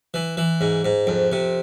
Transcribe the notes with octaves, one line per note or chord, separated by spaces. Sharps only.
E3
E3
G#2
G#2
F2
C3